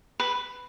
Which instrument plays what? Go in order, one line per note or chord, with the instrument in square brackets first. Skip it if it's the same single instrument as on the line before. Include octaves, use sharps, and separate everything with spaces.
[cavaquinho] B4